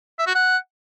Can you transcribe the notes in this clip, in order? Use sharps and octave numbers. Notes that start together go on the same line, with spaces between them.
E5
F#4
F#5